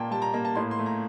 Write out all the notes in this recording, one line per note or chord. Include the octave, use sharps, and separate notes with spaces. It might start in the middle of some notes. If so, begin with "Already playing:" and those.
Already playing: A#2 A#3 G5 A5
G3 A5
A#5
A#3 A#5
A5
A2 C6
C6
A3
A#5